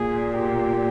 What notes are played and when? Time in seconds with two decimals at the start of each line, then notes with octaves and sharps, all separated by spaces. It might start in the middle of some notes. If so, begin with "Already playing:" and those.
Already playing: A#2 G#4
0.32 G4